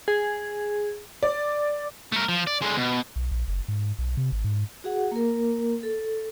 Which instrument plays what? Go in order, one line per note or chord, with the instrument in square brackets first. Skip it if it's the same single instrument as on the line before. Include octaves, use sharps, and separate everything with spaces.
[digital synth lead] G#4
[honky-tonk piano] D5
[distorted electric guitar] A3 A#4
F3
D5
D3 G#3
B2
[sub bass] B1
A#1
F#1
G#2
B1
C3
G#1
G#2
[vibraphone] F#4 G#4 F#5
A#3 A#4
A4